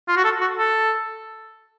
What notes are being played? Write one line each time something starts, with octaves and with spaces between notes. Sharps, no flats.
F4
F#4
A4
F#4
A4